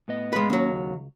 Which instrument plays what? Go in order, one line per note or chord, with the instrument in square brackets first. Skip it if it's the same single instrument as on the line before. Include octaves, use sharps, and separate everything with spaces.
[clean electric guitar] A2 B3 D#5
[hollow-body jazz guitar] G#3 B4
[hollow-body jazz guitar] D#2 F#3 [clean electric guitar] A#3 C#4
[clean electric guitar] C#2